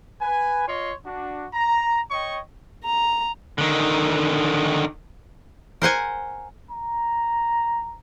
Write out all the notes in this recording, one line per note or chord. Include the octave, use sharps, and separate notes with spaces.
B4 G#5
F4 C#5 D#5 C6
D4 F#4
A#5
C#5 D#5 G5 C#6
A#5
D3 D#3
A#4 C5 F#5 G#5
A#5